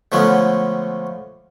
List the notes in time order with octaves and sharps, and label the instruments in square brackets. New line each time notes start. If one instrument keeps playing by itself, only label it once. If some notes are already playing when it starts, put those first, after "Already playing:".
[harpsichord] D3 F3 G#3 A3 B3 C#4